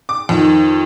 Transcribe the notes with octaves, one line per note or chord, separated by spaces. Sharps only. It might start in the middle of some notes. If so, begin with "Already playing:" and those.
D6
F2 D#3